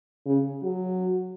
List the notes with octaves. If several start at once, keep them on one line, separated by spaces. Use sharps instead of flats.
C#3
F#3